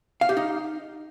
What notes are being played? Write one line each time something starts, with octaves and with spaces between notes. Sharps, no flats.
F5
G4
D#4